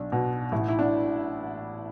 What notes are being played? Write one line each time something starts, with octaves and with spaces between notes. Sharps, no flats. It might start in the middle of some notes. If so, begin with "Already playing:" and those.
Already playing: B1 D4
B2
A1 E4
E4
D4